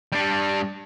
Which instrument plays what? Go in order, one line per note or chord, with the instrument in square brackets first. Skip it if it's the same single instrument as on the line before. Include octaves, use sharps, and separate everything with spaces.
[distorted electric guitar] G3 D4